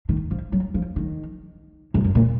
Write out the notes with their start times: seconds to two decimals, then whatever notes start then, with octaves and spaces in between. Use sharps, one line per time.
0.09 D#3
0.31 F3
0.52 F#3
0.74 F3
0.96 D#3
1.94 F#2
2.04 F#2
2.15 A#2